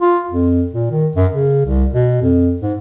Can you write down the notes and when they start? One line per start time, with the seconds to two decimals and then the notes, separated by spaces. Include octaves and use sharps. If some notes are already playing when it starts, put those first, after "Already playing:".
0.01 F4
0.31 F2
0.72 A#2
0.91 D#3
1.15 F#2
1.33 C#3
1.65 C2
1.93 B2
2.22 F2
2.62 G#2